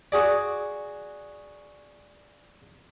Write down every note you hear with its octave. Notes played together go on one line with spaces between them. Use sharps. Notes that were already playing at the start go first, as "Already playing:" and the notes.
F#4 G#4 D5